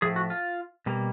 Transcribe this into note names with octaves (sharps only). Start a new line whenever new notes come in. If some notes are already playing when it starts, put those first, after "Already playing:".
A2 F3 A3 G#4
F#4
F4
B2 G3 A#3